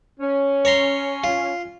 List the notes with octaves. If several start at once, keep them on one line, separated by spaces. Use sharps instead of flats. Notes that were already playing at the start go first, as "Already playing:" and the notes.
C#4
C#5 A#5 C6
F4